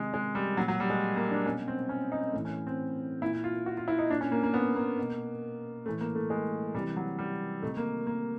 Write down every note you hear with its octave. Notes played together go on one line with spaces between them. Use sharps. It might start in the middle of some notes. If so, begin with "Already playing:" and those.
Already playing: C3 D#3 G#3
G#3
G3
A#2 F#3
F#3
G3
G#3
A#3
D4
B2 C#4
C4
C#4
D#4
A2 E3
C#4
C4
A#2 E4
F4
F#4
F4
E4
D#4
A#2 D4
C#4
A#3
A#3
B3
A#3
B2
A2 E3 A3
A#3
A3
G#3
C3 E3 G3
F#3
G3
C3 D#3 A3
A#3
A#3